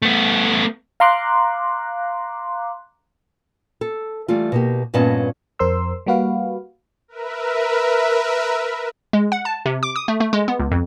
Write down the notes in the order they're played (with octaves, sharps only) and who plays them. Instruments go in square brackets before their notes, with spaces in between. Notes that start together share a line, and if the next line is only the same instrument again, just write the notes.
[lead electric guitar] A3 B3
[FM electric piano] F5 A#5 C6 D6 F#6
[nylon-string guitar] A4
E3 G3 A3 F4
B2 A#3 G4
G2 A#2 B3 C#4 D#5 A5
[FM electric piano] F2 A#4 C5 C6 E6
G3 A#3 F#4 B4 F5
[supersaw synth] A#4 B4 E5
[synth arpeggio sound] G#3
F#5
A5
C3
D6
D#6
A3
A3
G#3
B3
C#2
F2